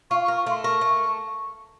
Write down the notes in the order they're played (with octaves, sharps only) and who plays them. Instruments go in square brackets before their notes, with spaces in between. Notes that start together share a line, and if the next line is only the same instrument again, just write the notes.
[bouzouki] F4 [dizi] C#6
[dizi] C#6
[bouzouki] A#4
[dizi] C#6
[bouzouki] A3 [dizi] C6
[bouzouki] A#4 [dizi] C#6
[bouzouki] A3